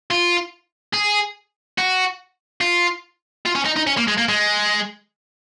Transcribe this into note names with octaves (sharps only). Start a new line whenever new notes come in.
F4
G#4
F#4
F4
F4
C#4
D#4
D#4
C#4
A#3
G#3
A#3
G#3